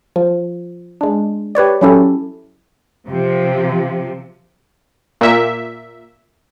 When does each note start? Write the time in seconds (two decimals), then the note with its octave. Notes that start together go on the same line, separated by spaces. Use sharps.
0.16 F3
1.01 G#3 D4
1.55 G4 B4 C#5 D5
1.81 F#3 C#4 E4 G4 A4
3.08 C3 F3
5.21 A#2 E5